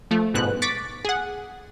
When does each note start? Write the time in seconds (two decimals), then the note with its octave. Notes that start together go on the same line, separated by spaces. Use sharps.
0.11 F3 A3
0.34 G1 G#2 B2 F#6
0.62 C#6 D6 A6 B6
1.05 G#4 F#5